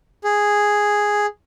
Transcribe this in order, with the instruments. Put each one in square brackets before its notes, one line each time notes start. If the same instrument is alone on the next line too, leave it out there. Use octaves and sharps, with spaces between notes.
[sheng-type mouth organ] G#4